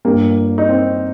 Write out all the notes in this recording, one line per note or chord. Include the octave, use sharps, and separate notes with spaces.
G1 G2 G3 A#3
D#4
C4